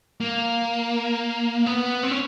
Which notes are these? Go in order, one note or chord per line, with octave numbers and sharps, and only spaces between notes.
A#3
B3
C4
C#4